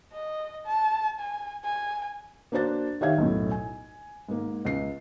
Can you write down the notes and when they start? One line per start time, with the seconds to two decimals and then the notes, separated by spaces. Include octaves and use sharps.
0.13 D#5
0.66 A5
1.20 G#5
1.64 G#5
2.52 A#3 D4 F#4 C5 A6
3.01 D#3 G4 C#5 E5 F5 G#6
3.18 B1 F#2 A2
3.51 G#5
4.29 G#2 A#3
4.65 C#2 C7